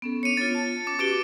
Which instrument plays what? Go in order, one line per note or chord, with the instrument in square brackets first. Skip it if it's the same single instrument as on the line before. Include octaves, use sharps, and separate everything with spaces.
[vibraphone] B3 C#4 A4
[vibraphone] D4 C#5 [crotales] C#7 D#7
[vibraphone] B3 F4 [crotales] A6
[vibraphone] A5
[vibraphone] C#4 [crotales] D6
[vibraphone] F#4 G4 B4 [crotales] D6 D7 G7